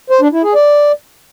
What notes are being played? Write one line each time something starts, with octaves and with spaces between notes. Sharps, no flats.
C5
D4
E4
G#4
D5